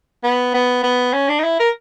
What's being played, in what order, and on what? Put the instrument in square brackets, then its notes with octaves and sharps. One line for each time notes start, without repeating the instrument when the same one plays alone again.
[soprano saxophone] B3
B3
B3
C#4
D4
D#4
E4
A#4